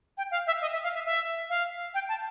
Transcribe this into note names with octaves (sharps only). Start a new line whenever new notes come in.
G5
F5
E5
D#5
E5
F5
E5
E5
F5
G5
A5